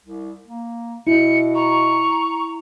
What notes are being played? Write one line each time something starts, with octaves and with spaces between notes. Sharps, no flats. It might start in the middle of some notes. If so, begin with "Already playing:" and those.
C2
A#3
B2 E4 C#7
A#5 C#6